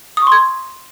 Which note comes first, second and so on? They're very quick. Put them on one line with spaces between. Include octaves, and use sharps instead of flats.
D#6 C#6 C6 G#6